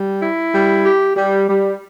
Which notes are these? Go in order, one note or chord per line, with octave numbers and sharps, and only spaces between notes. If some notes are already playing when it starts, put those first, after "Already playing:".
Already playing: G3
E4
G3
G4
G3
G3